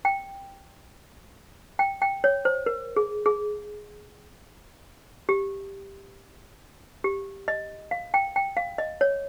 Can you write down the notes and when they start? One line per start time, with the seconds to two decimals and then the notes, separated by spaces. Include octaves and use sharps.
0.05 G5
1.79 G5
2.02 G5
2.24 C#5
2.45 C5
2.66 A#4
2.96 G#4
3.26 G#4
5.29 G4
7.04 G4
7.48 D#5
7.91 F5
8.14 G5
8.36 G5
8.57 F5
8.78 D#5
9.01 C#5